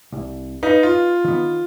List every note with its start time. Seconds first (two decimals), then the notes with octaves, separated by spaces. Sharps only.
0.12 C2
0.63 D#4 B4 D#5 F5
0.83 F4
1.24 D#3 B3